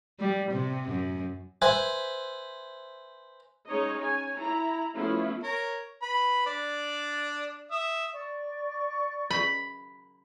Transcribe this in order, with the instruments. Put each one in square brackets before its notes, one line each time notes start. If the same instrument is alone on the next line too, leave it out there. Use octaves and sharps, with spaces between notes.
[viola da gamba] G3
C3
F#2
[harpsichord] B4 C5 E5 G#5
[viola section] G#3 C#4 D#4 C#5 D#5
C#5 G#5
E4 A#5
F3 A3 B3 C#4 E4 F4
[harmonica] A#4 C#5
B4 B5
D4 D5
E5 D#6
[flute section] D5 C#6
[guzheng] B5